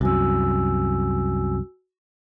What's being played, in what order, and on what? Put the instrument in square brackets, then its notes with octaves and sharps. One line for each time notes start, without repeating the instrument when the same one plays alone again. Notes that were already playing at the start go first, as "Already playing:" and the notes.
[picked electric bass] C2 F#2 [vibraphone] F#4 G#5 E6